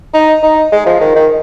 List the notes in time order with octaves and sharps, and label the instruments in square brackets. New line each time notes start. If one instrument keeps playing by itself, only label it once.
[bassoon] D#4
D#4
G#3
F3
D#3
D#3